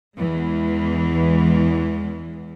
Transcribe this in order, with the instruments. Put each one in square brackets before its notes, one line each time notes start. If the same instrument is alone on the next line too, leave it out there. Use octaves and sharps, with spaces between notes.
[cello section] E2 E3 G#3